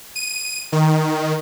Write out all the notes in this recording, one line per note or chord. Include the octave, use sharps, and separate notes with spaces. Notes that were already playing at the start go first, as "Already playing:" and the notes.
D#7
D#3